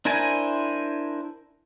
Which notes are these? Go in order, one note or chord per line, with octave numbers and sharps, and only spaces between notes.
D4 E4 A#4 C5 G#5